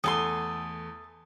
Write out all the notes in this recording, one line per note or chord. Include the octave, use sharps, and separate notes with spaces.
E2 A3 A4 G#5 C6 D#6